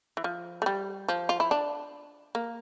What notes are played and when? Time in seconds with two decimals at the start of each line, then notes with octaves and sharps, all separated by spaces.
0.17 E3
0.24 F3
0.62 A3
0.66 G3
1.08 F3
1.29 F4
1.40 E4
1.51 D4
2.35 A#3